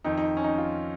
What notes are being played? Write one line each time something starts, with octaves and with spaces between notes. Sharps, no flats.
F2 D#3 D#4
D#4
C#4
D#4
F4